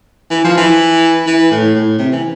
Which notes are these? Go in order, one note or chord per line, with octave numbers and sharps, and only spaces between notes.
E3
F3
E3
E3
A2
A2
C3
E3